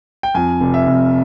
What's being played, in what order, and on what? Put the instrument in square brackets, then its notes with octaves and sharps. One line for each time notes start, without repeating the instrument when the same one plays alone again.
[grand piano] G5
F2 G#5
F1
E5
F1